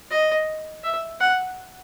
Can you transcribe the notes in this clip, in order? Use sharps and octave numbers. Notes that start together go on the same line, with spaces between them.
D#5
E5
F#5